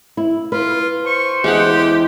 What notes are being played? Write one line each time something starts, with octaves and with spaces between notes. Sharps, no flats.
E4
F4 B4
C5 C#6
E2 G#3 D4 G4 F5 F#5